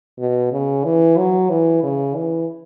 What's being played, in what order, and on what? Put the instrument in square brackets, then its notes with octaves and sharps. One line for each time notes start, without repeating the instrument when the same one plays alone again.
[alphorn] B2
C#3
E3
F#3
E3
C#3
E3